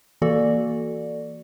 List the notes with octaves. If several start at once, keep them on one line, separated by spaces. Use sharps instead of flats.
E3 A#3 F#4 A4 D5